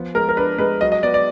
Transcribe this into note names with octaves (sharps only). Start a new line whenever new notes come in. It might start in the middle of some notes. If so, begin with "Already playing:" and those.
Already playing: F3 B3
G#3 A#4
A#4
D4 B4
G#3 B4
F#3 D#5
D#5
B3 D5
D5